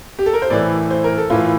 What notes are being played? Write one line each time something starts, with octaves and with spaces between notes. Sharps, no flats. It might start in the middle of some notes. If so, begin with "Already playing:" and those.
G4
A4
A#4
C5
A2 E3 D5
C5
A#4
A4
A2 E3 F4